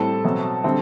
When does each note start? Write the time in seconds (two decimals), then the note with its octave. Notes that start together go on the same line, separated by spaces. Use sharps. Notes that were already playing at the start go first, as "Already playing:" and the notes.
Already playing: A2 G3 C4 A4 A5
0.24 B2 F#3 C4
0.64 D3 G3 C4